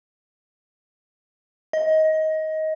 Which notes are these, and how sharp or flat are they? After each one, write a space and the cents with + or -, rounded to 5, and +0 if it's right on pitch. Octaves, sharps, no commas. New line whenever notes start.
D#5 +20